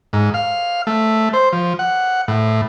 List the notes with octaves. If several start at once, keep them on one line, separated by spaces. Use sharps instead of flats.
G#2
F5
A3
C5
F3
F#5
A2